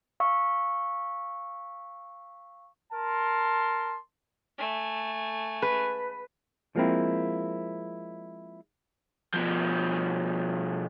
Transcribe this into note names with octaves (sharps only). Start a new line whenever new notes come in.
F5 C#6 E6
A#4 A5 C6
A3 G#5
B4
F3 G#3 A#3 C4 E4
B2 F3